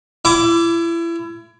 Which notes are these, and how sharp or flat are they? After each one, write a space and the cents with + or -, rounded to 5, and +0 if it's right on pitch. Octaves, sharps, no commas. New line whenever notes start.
E4 +30 D6 -15